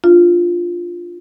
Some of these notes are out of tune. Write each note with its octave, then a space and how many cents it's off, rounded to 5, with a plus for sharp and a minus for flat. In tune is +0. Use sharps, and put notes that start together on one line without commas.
D4 +0 F4 +0